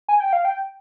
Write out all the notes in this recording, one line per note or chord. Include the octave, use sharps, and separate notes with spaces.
G#5
G5
F5
G5